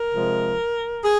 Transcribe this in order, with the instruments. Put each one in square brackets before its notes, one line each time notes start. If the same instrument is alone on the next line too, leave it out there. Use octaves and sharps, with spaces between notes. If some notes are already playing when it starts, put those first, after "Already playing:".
Already playing: [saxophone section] A#4
C3 F3 G#3
G#4